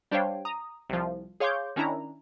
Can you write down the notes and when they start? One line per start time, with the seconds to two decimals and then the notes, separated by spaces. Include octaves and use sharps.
0.11 G3 D4 C5 C#5 F5 G5
0.45 A#5 D#6
0.90 C2 F3
1.40 G#4 C#5 F5 C6 D6 G6
1.76 D#3 C#4 D4 E4 A#5